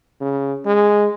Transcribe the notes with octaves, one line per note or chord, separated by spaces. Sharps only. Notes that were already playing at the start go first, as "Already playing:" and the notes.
C#3
G#3